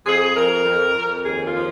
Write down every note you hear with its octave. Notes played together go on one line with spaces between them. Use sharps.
F2 G#4
F2 A#4
F2
F2
D#2 G#4
F4
F3